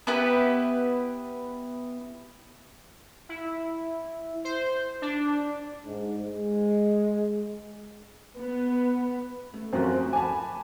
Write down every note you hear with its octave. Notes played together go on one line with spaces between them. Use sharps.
B3 E4 G4 B4
E4
C5
D4
G#2
G#3
B3
A3
F#2 F3 C4 F#4 A#4
D2
G#5 A5 B5 D6